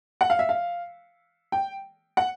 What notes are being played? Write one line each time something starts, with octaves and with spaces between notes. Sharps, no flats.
F#5
F5
E5
F5
G5
F#5